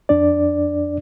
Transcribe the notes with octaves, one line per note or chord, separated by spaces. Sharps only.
F2 D4 D5